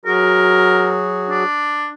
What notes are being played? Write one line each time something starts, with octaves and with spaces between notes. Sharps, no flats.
F#3 F#4 G#4 A#4
D4